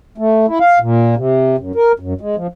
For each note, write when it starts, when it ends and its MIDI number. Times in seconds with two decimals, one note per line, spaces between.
0.18 0.46 57
0.48 0.59 64
0.60 0.79 77
0.80 1.15 46
1.16 1.56 48
1.58 1.72 42
1.75 1.92 70
1.99 2.13 42
2.21 2.36 56
2.36 2.47 53